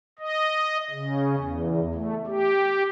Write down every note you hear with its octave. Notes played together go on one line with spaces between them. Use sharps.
D#5
C#3
E2
A3
G4